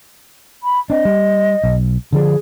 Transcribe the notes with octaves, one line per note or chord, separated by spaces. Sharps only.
B5
C4 D4 D#5
G3
B1
D3 F3 D4 G#4